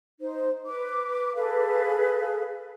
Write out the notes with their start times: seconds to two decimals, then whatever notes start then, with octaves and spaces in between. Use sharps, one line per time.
0.21 D#4 C5
0.65 B4 D6
1.35 G#4 A4 B4 F5